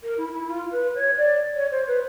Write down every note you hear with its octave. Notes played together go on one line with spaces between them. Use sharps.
A#4
E4
E4
F4
B4
C#5
D5
C#5
C5
B4